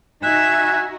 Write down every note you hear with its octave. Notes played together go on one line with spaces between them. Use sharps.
D#4 F#4 E5 G#5 F#6